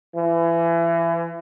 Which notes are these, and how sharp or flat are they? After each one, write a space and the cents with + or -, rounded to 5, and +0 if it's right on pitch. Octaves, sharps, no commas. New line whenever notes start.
E3 +30